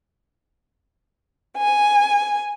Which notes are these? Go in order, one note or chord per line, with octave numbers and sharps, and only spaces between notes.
G#5